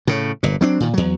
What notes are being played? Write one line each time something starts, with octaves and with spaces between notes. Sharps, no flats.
A2 C#3
G1 A#2
F#3 C4 D4
A#2 D#3
E2 F#3